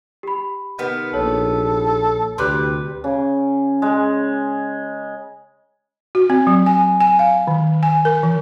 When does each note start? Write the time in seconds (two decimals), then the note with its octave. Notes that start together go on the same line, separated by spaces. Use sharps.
0.23 G4 B5
0.78 C3 D#3 B3
1.14 A#1 A4 C#5
2.38 D2 C3 G3 B4 C6 D6 F#6
3.04 C#3
3.82 G#3
6.15 F#4
6.30 C4
6.47 F#3
6.66 G#5
7.00 G#5
7.19 F5
7.47 D#3
7.83 G#5
8.05 A#4
8.23 E3